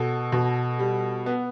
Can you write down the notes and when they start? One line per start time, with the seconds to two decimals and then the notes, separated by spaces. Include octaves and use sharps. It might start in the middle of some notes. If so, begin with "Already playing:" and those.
Already playing: B2 A4
0.32 B2
0.79 G3
1.26 B3